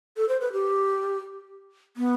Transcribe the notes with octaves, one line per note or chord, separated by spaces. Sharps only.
A4
C5
B4
G4
B3